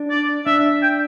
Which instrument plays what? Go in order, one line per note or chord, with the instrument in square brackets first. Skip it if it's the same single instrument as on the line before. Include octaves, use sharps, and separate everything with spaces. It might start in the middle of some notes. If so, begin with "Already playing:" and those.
Already playing: [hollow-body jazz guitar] D4
[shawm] D5
[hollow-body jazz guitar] D4 [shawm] E5
[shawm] G5